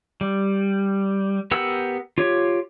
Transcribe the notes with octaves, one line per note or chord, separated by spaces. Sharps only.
G3
B3 G4 A#4 F#5 E6
F4 G4 C#5